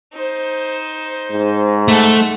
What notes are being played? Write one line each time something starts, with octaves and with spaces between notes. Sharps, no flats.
D#4 C5
G#2
A3 F#5 A5